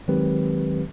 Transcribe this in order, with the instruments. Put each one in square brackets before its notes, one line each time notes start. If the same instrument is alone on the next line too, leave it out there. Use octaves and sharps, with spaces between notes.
[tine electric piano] D#3 F#3 G#3 C4 G4 B4